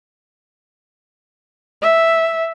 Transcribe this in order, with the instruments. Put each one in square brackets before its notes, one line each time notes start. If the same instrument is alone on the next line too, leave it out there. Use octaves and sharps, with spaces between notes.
[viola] E5